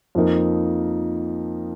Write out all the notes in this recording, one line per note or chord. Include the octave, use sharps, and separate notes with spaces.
F2 F3 A#3 D#4 A#4